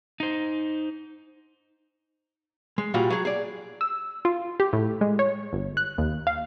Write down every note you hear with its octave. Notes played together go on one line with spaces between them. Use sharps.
D#4 C5
G#3
A#2 G3 F4 F#4
F#3 G#4
G#4 D5
E6
F4
G4
A2
G#3
C#5
G1
F#6
D#2
F5